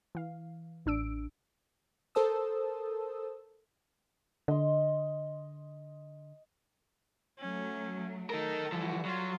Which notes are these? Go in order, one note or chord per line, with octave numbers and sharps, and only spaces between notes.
E3 F5
A1 D4 E6 D7
A4 A#4 C5 A5 D#6 E6
D3 D#5 C6
F#3 A3 C#4
D#4 A4 A#4
E3 F3 G3 F#4
F#3 F4